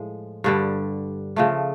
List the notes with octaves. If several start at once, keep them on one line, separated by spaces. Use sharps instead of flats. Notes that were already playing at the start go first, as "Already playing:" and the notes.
Already playing: A2 F3 G#3
G2 D3 G3
C#3 F3 A3